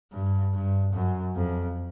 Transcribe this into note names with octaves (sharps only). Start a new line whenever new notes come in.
G2
G2
F#2
F2